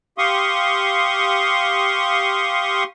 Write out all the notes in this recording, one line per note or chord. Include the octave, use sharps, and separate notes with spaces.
G4 F5 C6 C#6 D#6